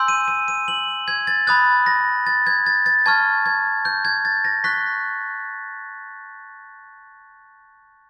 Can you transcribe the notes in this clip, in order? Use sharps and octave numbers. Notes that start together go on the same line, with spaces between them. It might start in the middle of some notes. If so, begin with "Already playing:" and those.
Already playing: G#5 C6 E6 G6
D#7
D#7
D#7
F#7
G#6
A6
B5 D#6 F#6 A6
A#6
A6
G#6
A6
A6
A5 C#6 F6 G#6
G#6
G6
G#6
A6
A#6
C#6 F#6 B6